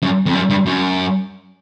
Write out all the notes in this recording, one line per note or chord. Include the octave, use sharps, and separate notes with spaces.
F#2
F2
F#2
G2
F#2